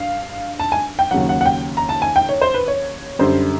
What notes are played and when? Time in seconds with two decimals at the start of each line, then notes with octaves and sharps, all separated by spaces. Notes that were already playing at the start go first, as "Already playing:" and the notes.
Already playing: G2 F5
0.60 A5
0.72 G#5
0.99 G5
1.11 D#2 C#3 F#3 F#5
1.29 F#5
1.41 F#5
1.46 G5
1.77 A#5
1.89 A5
2.02 G#5
2.16 G5
2.29 C#5
2.41 C5
2.54 B4
2.68 C#5
3.19 F#2 D3 G3 C5